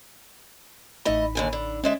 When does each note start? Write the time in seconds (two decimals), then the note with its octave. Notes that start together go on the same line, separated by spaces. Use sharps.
1.05 A1 A3 D#4 D#5 B5
1.35 D#2 D3 G#5
1.53 D3
1.84 D3 G#3 C#4 E5